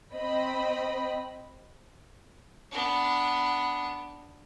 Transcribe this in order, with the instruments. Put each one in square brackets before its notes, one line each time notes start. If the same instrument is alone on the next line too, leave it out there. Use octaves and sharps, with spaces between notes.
[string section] C4 C5 D#5 G5 B5
[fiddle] B3 D4